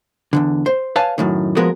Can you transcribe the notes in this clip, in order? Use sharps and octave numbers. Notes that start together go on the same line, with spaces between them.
E2 G2 D3
C5
B4 C#5 F5 G#5 A5
F#2 A2 D#3
F3 G#3 B3 F#4 G#4 A#4